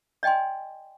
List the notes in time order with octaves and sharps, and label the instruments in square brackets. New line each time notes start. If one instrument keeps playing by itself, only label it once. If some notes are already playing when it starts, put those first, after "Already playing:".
[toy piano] D5 D#5 G5 G#5 C6